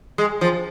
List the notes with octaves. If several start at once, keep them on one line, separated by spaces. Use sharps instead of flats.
G#3
F3